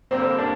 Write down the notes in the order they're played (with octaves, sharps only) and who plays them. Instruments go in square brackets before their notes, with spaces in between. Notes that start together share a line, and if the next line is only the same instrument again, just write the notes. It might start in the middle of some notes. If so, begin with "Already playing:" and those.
[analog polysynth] D3 G3 A#3 [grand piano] C4
[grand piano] D4